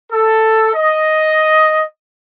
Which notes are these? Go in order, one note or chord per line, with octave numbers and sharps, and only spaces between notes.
A4
D#5